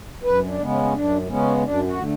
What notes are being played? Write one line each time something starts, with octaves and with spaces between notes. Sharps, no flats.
F#2 B4
D4
C#3 G#3 B3
C#4
C#4
F#2 D4
C#3 G#3 B3 C#4
F#2 D4
F#4
D3 A3